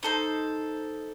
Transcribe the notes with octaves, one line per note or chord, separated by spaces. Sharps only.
D#4 A4 C5